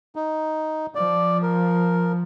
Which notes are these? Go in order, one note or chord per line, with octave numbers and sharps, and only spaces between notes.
D#4
F3 D5
A#4